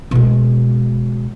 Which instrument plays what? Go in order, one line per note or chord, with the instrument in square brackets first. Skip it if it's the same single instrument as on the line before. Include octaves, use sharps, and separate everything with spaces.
[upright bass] B2 G#3